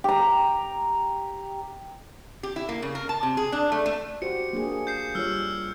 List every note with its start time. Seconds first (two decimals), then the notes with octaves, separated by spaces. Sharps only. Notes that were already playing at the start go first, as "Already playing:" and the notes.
0.04 G4 A#5
2.43 G4
2.56 E4
2.69 A#3
2.82 C#3
2.95 A#4
3.09 A5
3.23 C3
3.37 G#4
3.52 D4
3.72 A3
3.86 A3
4.22 F#4 G4 C5 C#7
4.53 A#3 D4 G#4
4.87 G6 C7
5.15 G3 F4 C#5 E6 F6